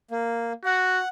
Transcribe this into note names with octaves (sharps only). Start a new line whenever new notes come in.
A#3
F#4 F#5